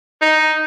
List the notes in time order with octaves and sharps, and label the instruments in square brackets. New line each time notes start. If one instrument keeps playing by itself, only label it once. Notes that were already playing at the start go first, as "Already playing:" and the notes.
[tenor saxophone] D#4